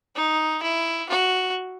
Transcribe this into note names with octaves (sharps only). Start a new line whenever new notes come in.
D#4
E4
F#4